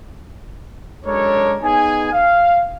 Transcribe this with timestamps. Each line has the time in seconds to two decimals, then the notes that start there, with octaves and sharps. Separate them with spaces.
1.05 F#2 G#3 D4 A4 A#4 C#5
1.62 B3 D#4 G#4 G#5
2.13 F5